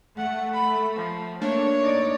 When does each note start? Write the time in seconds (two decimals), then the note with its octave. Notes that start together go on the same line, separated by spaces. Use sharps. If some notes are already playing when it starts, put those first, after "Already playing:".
0.17 A3 F#5
0.54 B5
0.96 F3
1.42 A3 A#3 D4 C#5
1.81 D#4 D5